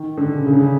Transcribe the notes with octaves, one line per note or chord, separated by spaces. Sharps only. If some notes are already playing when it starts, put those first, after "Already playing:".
Already playing: D#3
D3
C#3
C#3
D3
C#3